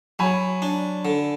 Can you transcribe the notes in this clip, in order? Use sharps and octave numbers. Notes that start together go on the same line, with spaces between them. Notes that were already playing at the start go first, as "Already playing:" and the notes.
F#3 G#5 B5
D4
D3